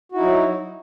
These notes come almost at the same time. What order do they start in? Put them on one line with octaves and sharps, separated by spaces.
F#4 E4 D#4 F#3